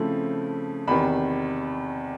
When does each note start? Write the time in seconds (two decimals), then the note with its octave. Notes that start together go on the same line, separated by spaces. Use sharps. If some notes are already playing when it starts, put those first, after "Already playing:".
Already playing: C#3 F3 A3 C4 E4
0.87 E2 C3 D#3 B5